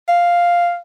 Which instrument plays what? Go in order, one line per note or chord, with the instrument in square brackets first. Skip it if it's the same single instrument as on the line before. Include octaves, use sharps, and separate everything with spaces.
[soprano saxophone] F5